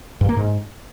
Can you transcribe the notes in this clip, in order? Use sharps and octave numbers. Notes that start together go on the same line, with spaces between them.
G2
A#3
G#2